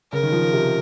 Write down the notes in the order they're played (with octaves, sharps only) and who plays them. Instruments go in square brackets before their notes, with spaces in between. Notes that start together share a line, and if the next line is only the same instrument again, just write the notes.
[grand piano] C#3 [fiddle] A#4
[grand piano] D#3
F3
C3